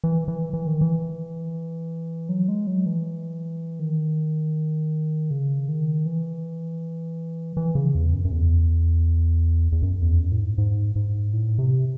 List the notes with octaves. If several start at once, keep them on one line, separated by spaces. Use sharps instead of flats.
E3
E3
E3
D#3
E3
F#3
G#3
F#3
E3
D#3
C#3
D#3
E3
E3
C#3
E2
F#2
F#2
E2
E2
F#2
E2
F#2
A2
G#2
G#2
G#2
A2
C3